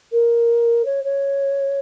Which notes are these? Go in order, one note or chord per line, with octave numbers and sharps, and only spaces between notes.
A#4
C#5
C#5